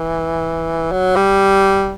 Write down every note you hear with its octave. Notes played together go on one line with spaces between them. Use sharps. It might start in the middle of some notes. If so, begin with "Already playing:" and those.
Already playing: E3
F#3
G3